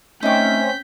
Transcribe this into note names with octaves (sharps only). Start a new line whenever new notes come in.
A3 C4 C#4 D#4 D6 G6 B6